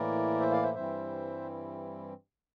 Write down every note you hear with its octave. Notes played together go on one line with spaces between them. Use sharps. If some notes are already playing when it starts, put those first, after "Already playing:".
Already playing: A2 E3 A#3 E4 A#4 D5
C5 E5
D5 F5
C5 E5
G2 E3 G3 C4 E4 C5 E5